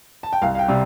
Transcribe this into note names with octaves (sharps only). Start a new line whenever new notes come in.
A5
G5
C2 F5
F5
G5
C3 G3